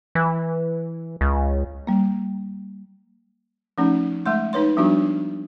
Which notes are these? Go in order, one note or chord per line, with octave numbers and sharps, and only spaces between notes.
E3
C#2
G3 A#3
F3 A3 C#4 D#4
G#3 A3 C6
D#4 B4 C#5 C6
F3 G3 B3 D4 F4 F#4